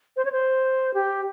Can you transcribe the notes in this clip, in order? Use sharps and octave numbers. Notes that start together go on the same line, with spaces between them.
C5
C#5
C5
G4